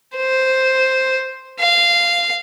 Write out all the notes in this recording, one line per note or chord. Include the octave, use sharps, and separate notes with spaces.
C5
F5